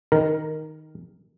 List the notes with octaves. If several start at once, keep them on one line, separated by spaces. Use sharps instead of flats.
D#3 A#4